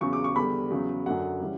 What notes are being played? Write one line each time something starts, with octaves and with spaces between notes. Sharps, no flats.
E2 C#3 F#3 C#6
D6
C#6
E2 D3 G3 B5
E2 C#3 F#3
F#2 D3 F#3 F#5
C#3 E3 G3